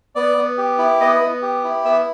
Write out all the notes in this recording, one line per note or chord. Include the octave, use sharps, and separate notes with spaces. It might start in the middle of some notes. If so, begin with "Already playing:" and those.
B3 D5
B3
G4
E4
B3 D#5
B3
G4
E4
B3 E5